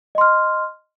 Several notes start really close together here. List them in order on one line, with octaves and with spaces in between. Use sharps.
D#5 C6 F6